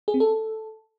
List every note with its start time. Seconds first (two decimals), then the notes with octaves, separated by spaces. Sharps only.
0.08 G#4
0.14 C4
0.20 A4